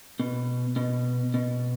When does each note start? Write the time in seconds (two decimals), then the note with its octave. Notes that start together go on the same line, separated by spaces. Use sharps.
0.20 B2
0.76 B2
1.34 B2